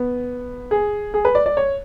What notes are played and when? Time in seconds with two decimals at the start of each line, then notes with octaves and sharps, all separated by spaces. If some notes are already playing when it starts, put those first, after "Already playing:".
Already playing: B3
0.71 G#4
1.14 G#4
1.25 B4
1.35 D5
1.46 D5
1.57 C#5